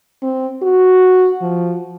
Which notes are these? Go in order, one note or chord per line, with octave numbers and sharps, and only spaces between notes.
C4
F#4
F3